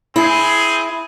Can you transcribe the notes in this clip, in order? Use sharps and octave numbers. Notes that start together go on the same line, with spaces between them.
C4 E4 G#4